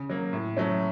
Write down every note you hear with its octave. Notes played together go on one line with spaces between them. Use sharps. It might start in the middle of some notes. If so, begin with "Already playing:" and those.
Already playing: C#3
F#3 A#3
A2
F#3 A3 C#4